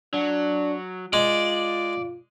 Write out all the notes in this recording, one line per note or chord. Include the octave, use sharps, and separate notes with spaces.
F#3 D4
G#3 F4 D5